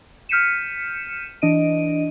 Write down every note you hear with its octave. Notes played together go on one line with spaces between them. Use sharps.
F6 G6 B6 C#7 D#7 E7
E3 D4 D#5 D7 D#7